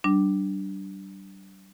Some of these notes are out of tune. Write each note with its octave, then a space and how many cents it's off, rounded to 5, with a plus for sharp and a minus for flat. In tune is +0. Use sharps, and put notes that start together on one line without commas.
G3 -35 D4 +0